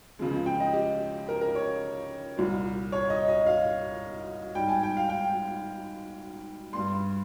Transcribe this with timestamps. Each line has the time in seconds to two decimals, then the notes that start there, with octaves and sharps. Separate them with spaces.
0.19 C#2 C#3 F3 G#3
0.46 G5
0.60 D#5
0.73 G4
1.29 A#4
1.41 A#4
1.55 C#5
2.37 C2 A#2 G3
2.92 C#5
3.10 D#5
3.28 D#5
3.46 F5
4.55 G#2 G3 G5
4.68 G#5
4.83 G5
4.97 F5
5.09 G5
6.73 G2 G3 C6